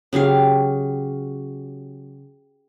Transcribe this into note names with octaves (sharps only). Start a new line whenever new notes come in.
C#3 F#3 G4 F5